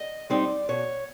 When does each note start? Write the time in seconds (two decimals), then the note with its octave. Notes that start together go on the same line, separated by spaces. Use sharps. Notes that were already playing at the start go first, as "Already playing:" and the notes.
Already playing: D#5
0.30 G3 C4 D#4 D5
0.69 B2 C#5